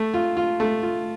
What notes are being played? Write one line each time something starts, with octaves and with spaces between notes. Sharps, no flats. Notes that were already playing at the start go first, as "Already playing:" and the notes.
Already playing: A3
F4
F4
A3
F4